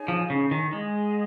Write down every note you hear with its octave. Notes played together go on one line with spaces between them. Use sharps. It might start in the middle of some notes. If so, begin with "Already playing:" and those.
Already playing: D#4 G#4 C#5 G#5
F3
C#3
D#3
G#3 G#4 D#5 F#5